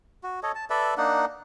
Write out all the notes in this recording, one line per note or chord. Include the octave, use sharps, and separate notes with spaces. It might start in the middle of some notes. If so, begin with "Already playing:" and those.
F#4
A4 C#5 D#5
A5
A4 B4 D5 E5
A#3 D4 D#4 F#5